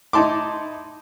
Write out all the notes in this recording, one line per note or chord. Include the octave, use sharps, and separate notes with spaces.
D#4 E4 A5 C6 D6